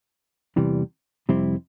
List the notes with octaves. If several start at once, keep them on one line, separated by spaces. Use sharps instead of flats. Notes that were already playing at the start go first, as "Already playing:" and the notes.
E2 C3 E3 G3
F2 C3 G3 C4 E4